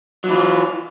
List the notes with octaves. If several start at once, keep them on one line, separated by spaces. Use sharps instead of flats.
E3 F#3 F4